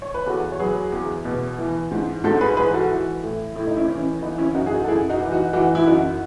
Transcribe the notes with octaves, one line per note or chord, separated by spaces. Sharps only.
C#5
B4
E2 F#4 A4
C#5
F#3 G#4 B4
E2
B2
E3
G#2
G#2 F#4 A4
G#4 B4
E3 G#4 B4
F#4 A4
E3
A2
A2 E4
D#4
C#4 E4
E3 C#4
E3 B3 D#4
C#4 E4
F#2 D#4 F#4
G#4
D#4 F#4
A4
F#2 E4 G#4
D#4 F#4
E3
D#4 F#4
E3 D#4 F#4
E4
F#2 D#4 F#4